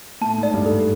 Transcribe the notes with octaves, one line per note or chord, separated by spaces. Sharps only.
A2 A5
G#2
D5
G2
A4